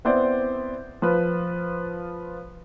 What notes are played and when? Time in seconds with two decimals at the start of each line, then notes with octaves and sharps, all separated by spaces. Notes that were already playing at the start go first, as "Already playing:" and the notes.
0.05 B3 C4 E4 C5 D5
1.02 F3 F4 B4